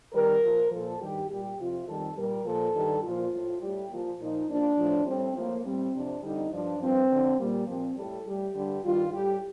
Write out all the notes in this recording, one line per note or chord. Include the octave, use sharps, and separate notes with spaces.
F2 D#3 G3 A#4
A#2 F3
A#2 F3 A4
G2 D#3 G3 G4
A#2 G3 G4
F2 C3 F3 F4
F2 D#3 G3 A4
A#2 G3 A#4
A#2 F3 A4
G2 D#3 G3
A#2 F3 F4
A2 F3
A2 G3 G4
A#2 F3
A#2 F3 D#4
A#2 F3 D4
A2 F3
A2 G3 C4
A2 F3 A#3
A2 G3 C4
F2 C3 F3 D4
F2 D3 G3 D#4
G2 F3 D4
G2 F3 C4
F2 D3 F3
A#2 G3 A#3
A#2 F3 C4
A2 G3 A4
A2 G3 G4
G2 D3 G3
G2 D#3 G3 F4
A2 G3 G4